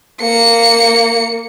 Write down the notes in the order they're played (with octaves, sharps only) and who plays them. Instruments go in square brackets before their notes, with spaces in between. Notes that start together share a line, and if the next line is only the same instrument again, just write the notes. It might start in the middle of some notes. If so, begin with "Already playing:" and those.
[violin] A#3 C#7